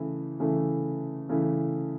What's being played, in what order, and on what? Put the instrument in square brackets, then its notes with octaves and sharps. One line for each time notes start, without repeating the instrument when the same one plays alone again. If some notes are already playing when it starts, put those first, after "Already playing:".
Already playing: [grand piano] C#3 E3 A3 E4
C#3 E3 A3 E4
C#3 E3 A3 E4